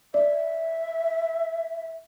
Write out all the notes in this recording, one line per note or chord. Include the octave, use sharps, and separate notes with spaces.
D5 E5